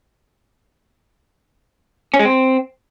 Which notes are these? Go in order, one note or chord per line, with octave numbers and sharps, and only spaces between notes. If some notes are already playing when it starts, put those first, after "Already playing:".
C#4
G#3
C4